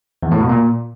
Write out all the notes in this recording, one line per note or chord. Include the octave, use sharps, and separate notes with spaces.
E2
A2
B2
A#2